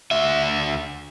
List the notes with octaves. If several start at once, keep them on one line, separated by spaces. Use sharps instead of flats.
D2 E5